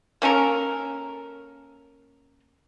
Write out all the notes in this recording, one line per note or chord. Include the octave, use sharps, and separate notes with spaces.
A#3 C#4 A4 A#4